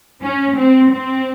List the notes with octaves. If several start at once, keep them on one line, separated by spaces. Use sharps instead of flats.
C#4
C4
C4